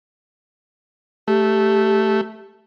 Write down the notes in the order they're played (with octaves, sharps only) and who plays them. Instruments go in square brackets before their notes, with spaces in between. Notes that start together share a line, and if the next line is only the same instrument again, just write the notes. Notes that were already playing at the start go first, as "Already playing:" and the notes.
[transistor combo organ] A3 [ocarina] G4